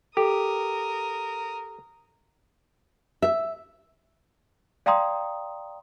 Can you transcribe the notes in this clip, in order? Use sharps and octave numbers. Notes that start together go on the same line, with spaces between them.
G4 A4 A#4 D#6
E5
D5 F5 G5 A#5 C6 D#6